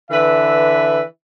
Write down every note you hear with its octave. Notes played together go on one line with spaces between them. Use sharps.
D3 E3 B4 E5